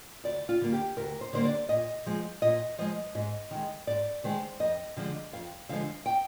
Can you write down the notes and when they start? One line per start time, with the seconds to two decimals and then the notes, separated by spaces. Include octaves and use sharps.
0.24 D2 D5
0.49 F4
0.61 D3 G3 A#3
0.73 G4
0.97 D2 A#4
1.21 C5
1.33 D3 G3 A#3 C5
1.45 D5
1.69 A#2 D#5
2.06 F3 G#3
2.42 A#2 D#5
2.78 F3 G#3 D#5
3.15 G#2 D#5
3.51 D#3 G#3
3.87 G#2 D5
4.24 D#3 G#3 C5
4.60 F2 D#5
4.97 D3 F3 G#3
5.32 F2 F5
5.69 D3 F3 G#3 F5
6.06 G5